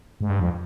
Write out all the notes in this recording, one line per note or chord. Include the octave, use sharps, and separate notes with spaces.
G#2
G2
F2